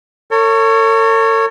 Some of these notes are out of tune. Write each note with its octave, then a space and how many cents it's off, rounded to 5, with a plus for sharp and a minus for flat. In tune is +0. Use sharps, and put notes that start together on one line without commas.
A4 +45 C#5 +0